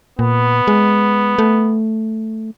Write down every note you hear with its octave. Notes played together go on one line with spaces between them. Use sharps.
A#2 B3
G#3
A3